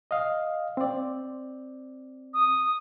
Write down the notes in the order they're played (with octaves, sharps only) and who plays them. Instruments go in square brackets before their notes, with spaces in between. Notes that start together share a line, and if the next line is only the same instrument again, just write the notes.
[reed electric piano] D#5 F5
C4 D5
[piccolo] D#6